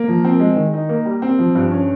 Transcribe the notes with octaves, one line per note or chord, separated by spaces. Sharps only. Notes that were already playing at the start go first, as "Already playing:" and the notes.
Already playing: A#3
F3
C4
G#3
D#3
D#4
A#3
G3
C4
F3
G2
C#4